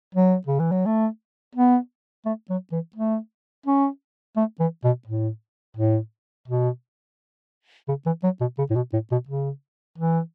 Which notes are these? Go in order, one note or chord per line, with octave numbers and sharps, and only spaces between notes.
F#3
C#3
E3
F#3
A3
B3
A3
F#3
E3
A3
C#4
A3
E3
B2
A2
A2
B2
C#3
E3
F#3
B2
C#3
A2
B2
A2
B2
C#3
E3